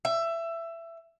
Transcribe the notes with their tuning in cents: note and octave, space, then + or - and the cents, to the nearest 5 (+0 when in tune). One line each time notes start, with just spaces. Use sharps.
E5 +20